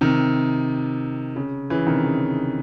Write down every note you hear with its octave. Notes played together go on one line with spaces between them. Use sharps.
C3 D#3
C#3
C#3 E3
C3 D#3
C#3